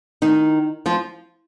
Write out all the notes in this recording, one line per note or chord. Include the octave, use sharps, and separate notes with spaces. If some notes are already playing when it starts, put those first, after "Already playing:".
D#3 D#4
F3 F4